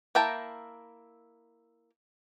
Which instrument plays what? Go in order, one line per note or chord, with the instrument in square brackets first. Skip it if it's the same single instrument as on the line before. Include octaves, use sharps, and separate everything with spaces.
[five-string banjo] A#3 E4 G5 A5 A#5